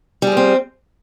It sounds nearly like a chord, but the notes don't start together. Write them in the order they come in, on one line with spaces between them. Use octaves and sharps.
G3 G#4 F3 C4